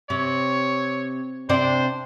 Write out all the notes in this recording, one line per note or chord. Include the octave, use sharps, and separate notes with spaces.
C3 C#5
C3 D4 C5 D5